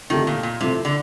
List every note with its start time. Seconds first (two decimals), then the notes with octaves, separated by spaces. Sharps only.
0.10 F2 D3 D#3 A3 D4 G4
0.27 A#2
0.43 A#2
0.61 A2 C3 F3 A3
0.85 D3